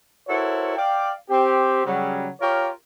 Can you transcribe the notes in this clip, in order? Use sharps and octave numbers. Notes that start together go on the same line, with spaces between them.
E4 F#4 A4 A#4 C5 C#5
D5 F5 G5
C4 G4
C#3 F#3 G3
F4 G4 A#4 C#5